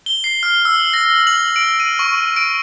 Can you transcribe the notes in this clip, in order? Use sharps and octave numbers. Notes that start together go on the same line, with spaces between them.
G7
C7
F6
E6
A#6
F#7
D7
D#7
C#6
D7